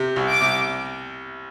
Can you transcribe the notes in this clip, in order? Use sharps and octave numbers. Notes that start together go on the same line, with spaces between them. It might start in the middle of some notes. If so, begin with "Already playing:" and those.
Already playing: C3
C2
D6
C2